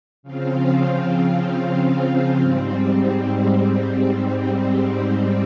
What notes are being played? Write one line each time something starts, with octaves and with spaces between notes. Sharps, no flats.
C#3 F3 C4 F4
G#2 G3 C4
G#2 G3 C4